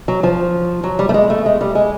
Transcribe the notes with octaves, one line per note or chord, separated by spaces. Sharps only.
F#3
F3
F#3
G3
A3
G#3
A3
G#3
G3
G#3